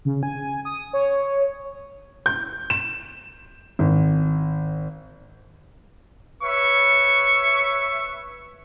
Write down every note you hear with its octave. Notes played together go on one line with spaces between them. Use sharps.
C#3
G#5
D#6
C#5
G6
E7
G#1
B4 C#5 E5 C#6